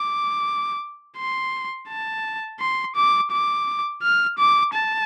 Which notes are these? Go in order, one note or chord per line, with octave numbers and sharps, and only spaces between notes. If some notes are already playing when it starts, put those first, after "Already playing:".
Already playing: D6
C6
A5
C6
D6
D6
F6
D6
A5